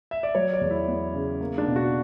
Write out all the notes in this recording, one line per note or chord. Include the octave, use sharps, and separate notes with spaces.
E5
D5
F#3 C#5
D5
E2
E4
B3
C#3
A#3
D4
B2
F#4